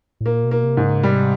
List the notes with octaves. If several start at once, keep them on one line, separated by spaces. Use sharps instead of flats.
A2
A#2 A#3
B2
A#3
C3
G#2
C#3
C3 G3